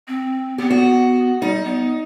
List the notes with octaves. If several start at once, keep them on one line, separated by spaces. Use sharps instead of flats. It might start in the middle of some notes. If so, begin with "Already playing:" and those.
C4
B3 G4
F#4
G3 D#4
B3